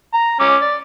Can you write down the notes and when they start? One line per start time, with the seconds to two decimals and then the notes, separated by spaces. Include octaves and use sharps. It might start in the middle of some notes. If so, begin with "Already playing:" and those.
0.14 A#5
0.40 C#4 D6
0.62 D5